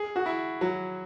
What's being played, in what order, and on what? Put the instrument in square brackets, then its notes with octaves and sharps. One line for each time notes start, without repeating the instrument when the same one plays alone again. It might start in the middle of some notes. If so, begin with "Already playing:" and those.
Already playing: [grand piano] G#4
F#4
E4
F#3